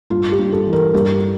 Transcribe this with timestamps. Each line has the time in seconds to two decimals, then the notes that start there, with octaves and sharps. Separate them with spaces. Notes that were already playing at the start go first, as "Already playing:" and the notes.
0.10 G2 F4
0.32 G4
0.39 G2
0.53 A4
0.67 E3
0.73 A#4
0.94 G2 G4